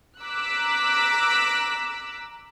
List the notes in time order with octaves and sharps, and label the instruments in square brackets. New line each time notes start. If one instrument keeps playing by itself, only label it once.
[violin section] A#5 D6 E6 F#6 B6